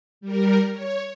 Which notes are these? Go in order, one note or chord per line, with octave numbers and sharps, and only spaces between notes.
G3 A#4
C#5